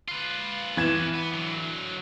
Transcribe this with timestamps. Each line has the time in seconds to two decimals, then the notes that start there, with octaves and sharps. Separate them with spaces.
0.08 F4 B4
0.77 E3 F3 B4 G#6 E7
1.14 B3
1.33 D3 F#3